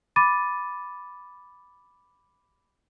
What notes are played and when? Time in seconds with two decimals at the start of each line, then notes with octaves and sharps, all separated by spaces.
0.16 B5 D6 A6 D#7